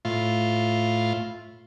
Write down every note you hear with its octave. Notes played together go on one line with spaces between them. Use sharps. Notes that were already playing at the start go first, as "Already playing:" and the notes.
A2 F4